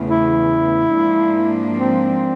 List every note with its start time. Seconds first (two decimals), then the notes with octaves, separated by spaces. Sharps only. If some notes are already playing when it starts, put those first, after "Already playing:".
Already playing: E2 C#3 E3 A3
0.10 E4
0.94 G#2 F3 A#3 D4
1.78 C4